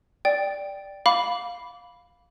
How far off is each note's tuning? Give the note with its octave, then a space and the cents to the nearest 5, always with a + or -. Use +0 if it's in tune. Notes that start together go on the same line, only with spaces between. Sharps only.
D5 +0 G5 +0
F5 +10 B5 +0 D6 -20